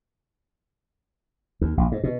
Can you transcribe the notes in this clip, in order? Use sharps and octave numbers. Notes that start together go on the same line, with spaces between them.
D#2
A#1
G#2
B2